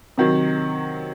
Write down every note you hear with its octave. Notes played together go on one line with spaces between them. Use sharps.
C3 D#3 F#3